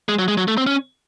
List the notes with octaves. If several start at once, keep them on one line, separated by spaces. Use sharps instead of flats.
G#3
F#3
G#3
F#3
A3
C4
C#4